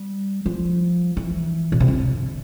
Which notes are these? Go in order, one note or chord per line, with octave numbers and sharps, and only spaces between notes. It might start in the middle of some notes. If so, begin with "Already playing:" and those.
Already playing: G3
F3
E3
B2
C3
D3